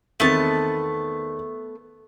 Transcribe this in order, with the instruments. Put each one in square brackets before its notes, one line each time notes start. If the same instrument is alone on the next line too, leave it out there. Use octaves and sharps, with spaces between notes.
[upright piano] E2 D#3 C4 [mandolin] A3 B3 A5